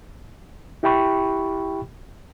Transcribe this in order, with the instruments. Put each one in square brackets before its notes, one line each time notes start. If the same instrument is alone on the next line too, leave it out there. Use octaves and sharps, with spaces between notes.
[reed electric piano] E4 G4 E5 G5 B5 C#6